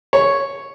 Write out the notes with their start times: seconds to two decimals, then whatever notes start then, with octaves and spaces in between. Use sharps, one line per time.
0.13 C#5